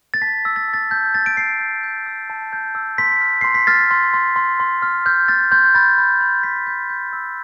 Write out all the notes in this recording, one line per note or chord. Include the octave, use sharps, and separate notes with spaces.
A6
A5 B6
E6
A6
A5
A6
A5 G6
A5 A6
D7
G6 C7
G6
G6
E6
A5
G6
E6
C6 B6
F6
C6 C7
B6
F6 A6
C6
C6
C6
C6
F6
F6 G6
F6 A6
C6 G6
B5 A6
B5
B5
G6 B6
G6
G6
E6